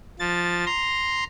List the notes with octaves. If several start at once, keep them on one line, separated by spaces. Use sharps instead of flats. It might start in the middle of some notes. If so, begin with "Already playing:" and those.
F3 A6
A#5 C6